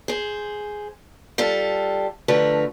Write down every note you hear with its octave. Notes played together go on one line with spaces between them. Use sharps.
G#4 C5
G3 F4 A4
D3 F3 A3 A#4 B4